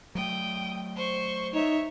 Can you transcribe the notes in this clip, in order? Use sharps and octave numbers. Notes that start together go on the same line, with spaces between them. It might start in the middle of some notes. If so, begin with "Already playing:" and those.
F#3 A3 G5 D#6
C5 C#6
D#4 C#5 E5